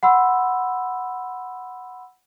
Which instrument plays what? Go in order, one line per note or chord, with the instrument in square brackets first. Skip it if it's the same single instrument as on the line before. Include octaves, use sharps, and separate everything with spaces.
[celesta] F#5 B5 C6 E6